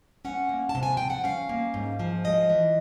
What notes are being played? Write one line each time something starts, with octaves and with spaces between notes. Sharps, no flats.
C#4 F#5
A#3
A5
C3
G#5
F3 G5
F#5
C#4 F5
A#3
G#2
F3
G#3 D#5
E3